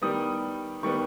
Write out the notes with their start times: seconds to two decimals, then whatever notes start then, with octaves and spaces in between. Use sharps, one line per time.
0.02 D#3 G3 B3 D#6
0.83 D#3 G3 B3 C#6